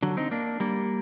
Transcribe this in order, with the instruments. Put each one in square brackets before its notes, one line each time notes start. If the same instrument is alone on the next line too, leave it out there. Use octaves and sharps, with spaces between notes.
[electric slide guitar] D3 F#3
C4 D#4
A#3 D4
G3 A#3